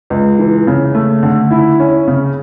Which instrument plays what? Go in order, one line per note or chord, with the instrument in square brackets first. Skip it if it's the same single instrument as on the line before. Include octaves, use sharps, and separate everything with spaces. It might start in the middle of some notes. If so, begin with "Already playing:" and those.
[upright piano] C#2
E3
C#3
A3
D3
E4
C#4
C#3